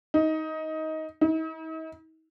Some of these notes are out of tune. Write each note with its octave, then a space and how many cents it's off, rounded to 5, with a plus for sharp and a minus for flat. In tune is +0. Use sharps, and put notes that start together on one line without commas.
D#4 +20
D#4 +45